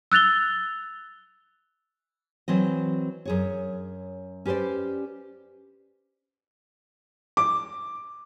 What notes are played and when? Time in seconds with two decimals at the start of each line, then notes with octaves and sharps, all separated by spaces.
0.12 E6 F#6 A6 F7 G7
2.48 E3 F#3 C4 D#5
3.26 F#2 G#4 C#5
4.45 C#4 G4 B4 C5 D5
7.37 D6